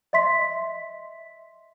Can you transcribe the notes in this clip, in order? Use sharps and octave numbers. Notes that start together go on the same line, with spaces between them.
D#5 E5 C6 B6